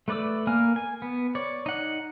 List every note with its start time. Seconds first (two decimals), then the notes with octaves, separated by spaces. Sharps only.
0.08 A3 B4 D5 D6 E6
0.47 A#3 A#4 G#5 F6
0.76 G#5
1.02 B3
1.35 C#5 D5
1.66 D#4 F#5